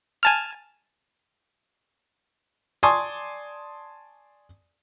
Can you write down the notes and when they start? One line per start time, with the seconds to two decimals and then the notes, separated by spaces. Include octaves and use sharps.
0.23 G#5 A5 F6
2.83 D5 G#5 A5 C6 C#6 D#6